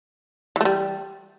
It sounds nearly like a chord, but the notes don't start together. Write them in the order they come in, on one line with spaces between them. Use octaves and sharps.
E3 A3 G3